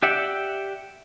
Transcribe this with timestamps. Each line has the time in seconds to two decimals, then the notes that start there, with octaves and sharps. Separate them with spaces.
0.03 G4 D5 E5 F#5 G5